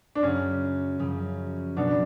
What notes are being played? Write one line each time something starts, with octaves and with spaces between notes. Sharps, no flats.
D4
F#2 C#3 F#3 C#4
F#2 C#3 F3
B2 F#3 B3 D4 D#4
D4